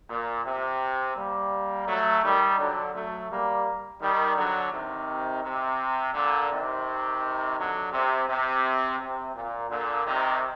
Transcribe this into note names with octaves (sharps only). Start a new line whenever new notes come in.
A#2
C3
G3 A#3
F#3 A3
D#3 G3
D3 F#3
F#3 A3
G3 A#3
D#3 G3
D3 F#3
C3 D#3
C3
A#2 D3
C3 D#3
D3 F#3
C3
C3
C3
A#2
A#2 D3
C3 D#3